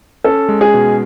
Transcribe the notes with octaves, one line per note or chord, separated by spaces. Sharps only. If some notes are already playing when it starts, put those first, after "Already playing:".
C#4 A4
G#3
G#4
B2